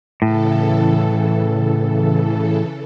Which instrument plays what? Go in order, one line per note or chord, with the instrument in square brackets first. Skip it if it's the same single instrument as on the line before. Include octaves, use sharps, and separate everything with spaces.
[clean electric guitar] A2 [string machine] C#3 E3 A4